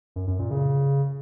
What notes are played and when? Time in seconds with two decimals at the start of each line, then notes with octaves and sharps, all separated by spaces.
0.16 F#2
0.27 F#2
0.39 A#2
0.51 C#3